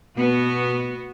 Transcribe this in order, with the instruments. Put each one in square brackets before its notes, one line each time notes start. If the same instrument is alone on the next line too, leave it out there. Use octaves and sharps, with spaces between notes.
[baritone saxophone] B2 [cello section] B3 F#4